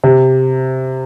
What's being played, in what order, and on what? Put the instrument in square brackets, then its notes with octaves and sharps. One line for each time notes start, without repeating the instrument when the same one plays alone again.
[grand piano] C3